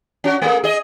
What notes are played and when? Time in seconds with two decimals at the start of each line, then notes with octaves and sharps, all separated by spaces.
0.24 C#4 F#4
0.42 A3 A#3 G#4
0.64 G#4 D#5